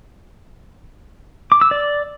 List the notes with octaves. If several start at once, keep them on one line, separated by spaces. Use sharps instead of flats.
D6
E6
D5